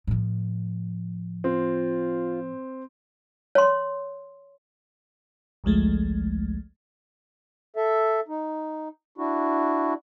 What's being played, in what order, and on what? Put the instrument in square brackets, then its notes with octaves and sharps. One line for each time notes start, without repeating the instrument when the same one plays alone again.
[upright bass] A2 F3
[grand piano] C4 [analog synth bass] F4
[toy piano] C#5 C6
[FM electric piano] A1 D2 F3 G#3 A3
[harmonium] A4 E5
D#4
D4 E4 F#4